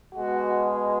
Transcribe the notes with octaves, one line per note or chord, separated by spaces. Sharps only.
B2 G#3 F#4